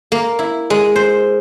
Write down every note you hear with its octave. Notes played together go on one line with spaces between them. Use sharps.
A#3
E4
G#3
C5